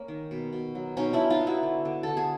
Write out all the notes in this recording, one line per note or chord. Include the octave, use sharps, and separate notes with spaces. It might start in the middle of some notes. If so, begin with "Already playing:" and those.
Already playing: A#3 C#4
D#3
B2
B2
F#3
B2 C#4 D#4
D4 E4
B2
D#4 F4
B3
E4 F#4
D3
D3
D3 A4
G#4